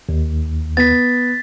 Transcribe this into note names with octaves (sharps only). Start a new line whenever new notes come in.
D#2
B3 A6 B6